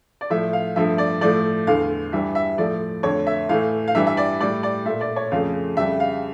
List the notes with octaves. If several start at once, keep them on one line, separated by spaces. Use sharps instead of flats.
D5
A2 F3 A3 E5
F5
G2 F3 A3 E5
D5
A2 F3 A3 D5
E2 D3 A3 F5
G2 E3 G3 E5
E5
A2 F3 A3 D5
F2 D3 A3 C#5
E5
A2 E3 A3 F5
F5
G2 E3 G3 E5
E5
D5
A2 G3 D5
D5
A#2 A3 E5
D5
C#5
F2 C#3 F3 A3 F5
F2 C#3 G3 E5
F5